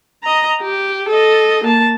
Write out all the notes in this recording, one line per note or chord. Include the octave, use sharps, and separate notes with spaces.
D#5 A#5
G4
A4 D#5
A#3 A5